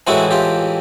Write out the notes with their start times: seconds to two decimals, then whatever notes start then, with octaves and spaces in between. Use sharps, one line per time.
0.07 A2 E3 G#3 C4 E4 F#4
0.31 F4 G4